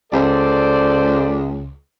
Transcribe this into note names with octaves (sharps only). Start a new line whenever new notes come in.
C#2 A4 C5 D5